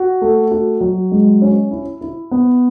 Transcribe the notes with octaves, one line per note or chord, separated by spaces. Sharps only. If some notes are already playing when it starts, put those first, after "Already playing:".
Already playing: F#4
A3
F#4
F#3
G#3
C#4
E4
E4
B3